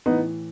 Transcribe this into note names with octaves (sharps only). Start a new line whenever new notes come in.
A2 E3 B3 D#4